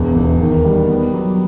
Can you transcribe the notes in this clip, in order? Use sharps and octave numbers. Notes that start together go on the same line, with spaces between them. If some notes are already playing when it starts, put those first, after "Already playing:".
Already playing: E1 E2
E1
D#3
G3
B3
F#3